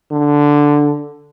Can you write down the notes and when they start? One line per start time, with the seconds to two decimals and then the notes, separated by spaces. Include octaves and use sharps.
0.11 D3